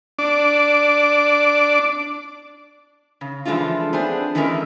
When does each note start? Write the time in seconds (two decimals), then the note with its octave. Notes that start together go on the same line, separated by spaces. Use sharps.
0.19 D4 D6
3.21 C#3
3.45 E3 F3 G#3 A3 D4 F4
3.93 B3 C4 D4 G#4 C5
4.35 D#3 E3 G#3 A3 C#4 A#4